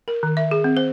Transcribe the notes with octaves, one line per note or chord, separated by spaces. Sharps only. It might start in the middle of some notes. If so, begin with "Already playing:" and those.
A#4
D#3
E5
G#4
C4
C5